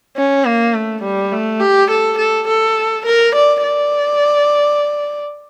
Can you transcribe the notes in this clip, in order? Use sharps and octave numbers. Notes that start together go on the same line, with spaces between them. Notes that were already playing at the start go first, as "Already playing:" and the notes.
C#4
A#3
A3
G3
A3
G4
A4
A4
A4
A#4
D5
D5